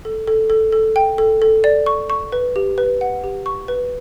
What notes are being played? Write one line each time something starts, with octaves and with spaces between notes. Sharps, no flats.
A4
A4
A4
A4
G5
A4
A4
D5
C#6
C#6
B4
G4
B4
F#5
G4
C#6
B4